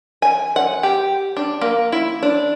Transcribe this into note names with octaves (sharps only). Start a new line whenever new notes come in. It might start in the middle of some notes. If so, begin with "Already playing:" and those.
G#5
F#5
G4
D4
A#3
E4
D4